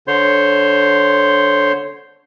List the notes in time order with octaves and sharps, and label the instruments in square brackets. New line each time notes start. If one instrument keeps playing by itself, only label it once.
[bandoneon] D3 C5 C#5 C6